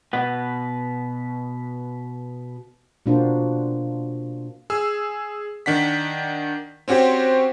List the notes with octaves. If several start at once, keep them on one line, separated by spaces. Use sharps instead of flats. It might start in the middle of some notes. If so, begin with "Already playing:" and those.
B2 B4 F#5
B2 A#3 D4 F4 F#4 C5
G#4 E6
D#3 D4 F#5 B6
C4 C#4 F#4 G4 C5